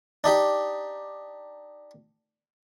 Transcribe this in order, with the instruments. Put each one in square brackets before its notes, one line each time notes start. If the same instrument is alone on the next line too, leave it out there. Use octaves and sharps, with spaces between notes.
[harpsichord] D4 D#4 G4